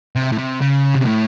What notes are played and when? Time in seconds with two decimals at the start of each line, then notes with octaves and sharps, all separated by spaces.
0.16 C3
0.32 A2
0.38 C3
0.61 C#3
0.95 C3
1.05 A2